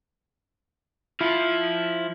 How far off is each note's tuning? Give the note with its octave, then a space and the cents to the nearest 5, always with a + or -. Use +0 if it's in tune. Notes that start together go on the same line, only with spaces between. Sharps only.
F3 +0 E4 +0